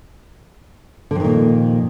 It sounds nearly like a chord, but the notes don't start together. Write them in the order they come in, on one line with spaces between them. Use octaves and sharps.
D3 F2 D#3 A#2